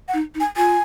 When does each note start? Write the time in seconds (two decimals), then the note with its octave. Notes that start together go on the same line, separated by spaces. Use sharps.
0.08 F#5
0.13 D#4
0.35 D#4
0.40 G#5
0.56 F4 G#5